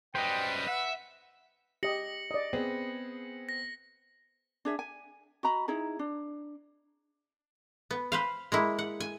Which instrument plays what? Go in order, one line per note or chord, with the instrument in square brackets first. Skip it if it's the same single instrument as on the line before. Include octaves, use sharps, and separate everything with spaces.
[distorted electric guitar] F#2 G3 [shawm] B4 [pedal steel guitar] C5 D#5 [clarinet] G5
[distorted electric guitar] E5 [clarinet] F#5
[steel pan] G4 D#5 [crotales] A#6 C#7 F#7
[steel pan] D5 D#5
[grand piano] B3 C4 G#4
[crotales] A#6
[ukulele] D4 G#4 E5
G#5
F#4 D#5 A#5 B5
D#4 E4 G#4 A#5
D4
[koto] B3
B4 C5 F5
G#3 A#3 E4
F#5
G#5